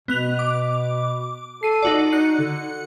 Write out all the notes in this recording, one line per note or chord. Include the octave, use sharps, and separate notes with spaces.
B2 B3 F#6 F7
D6
A4 C7 D#7
D#4 F#4 D5
D#4 F#6 C#7
D3